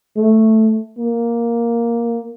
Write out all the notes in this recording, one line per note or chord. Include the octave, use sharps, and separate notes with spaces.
A3
A#3